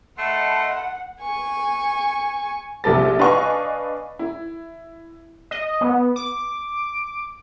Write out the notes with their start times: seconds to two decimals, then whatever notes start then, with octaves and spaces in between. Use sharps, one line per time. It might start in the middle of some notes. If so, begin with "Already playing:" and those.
0.18 A3 D#5 F#5 A5 B5 C6
1.21 G#5 C#6
2.84 A#1 C3 A4 A6
3.19 D4 B4 D#5 F5 G#5 C#6
4.19 E4
5.51 D#5
5.81 B3
6.16 D6